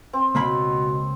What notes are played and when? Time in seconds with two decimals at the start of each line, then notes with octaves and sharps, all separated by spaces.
0.13 C4
0.35 C#2 B2 A#3 B5